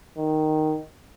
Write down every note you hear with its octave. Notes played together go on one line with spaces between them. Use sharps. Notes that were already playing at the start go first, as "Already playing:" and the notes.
D#3